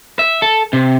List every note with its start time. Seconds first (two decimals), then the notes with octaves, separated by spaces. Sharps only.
0.19 E5
0.42 A4
0.73 C3